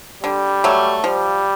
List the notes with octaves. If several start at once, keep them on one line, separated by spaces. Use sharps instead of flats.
D3 G3
F#3 A3
F3 G3